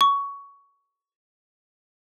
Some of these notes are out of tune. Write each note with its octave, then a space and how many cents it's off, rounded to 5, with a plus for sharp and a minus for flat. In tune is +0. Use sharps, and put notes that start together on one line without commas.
C#6 +15